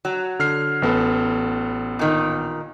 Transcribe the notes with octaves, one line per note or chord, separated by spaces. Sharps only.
F#3
D3 F6 C7
A1 B3 A4
A#2 D#3